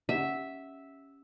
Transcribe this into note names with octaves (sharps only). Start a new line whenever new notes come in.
C#4 G4 E5 F#5